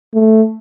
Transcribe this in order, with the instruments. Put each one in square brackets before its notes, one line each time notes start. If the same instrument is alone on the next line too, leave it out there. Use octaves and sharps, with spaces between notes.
[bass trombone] A3